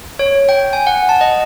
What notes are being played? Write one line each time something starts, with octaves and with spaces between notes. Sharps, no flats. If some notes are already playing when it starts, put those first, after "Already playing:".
C#5
G5
G#5
F#5
A5
D#5